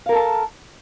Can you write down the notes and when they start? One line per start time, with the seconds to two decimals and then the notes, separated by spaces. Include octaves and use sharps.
0.06 F5
0.09 A#4
0.12 A4
0.15 A5